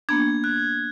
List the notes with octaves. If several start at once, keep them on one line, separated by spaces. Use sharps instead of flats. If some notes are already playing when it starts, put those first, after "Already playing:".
A#3 B3 D4 G#6
F#6